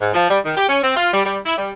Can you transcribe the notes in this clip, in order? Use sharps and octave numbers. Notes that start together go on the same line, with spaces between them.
G#2
F3
G3
D#3
G4
C#4
C4
F4
G3
G3
E4
G3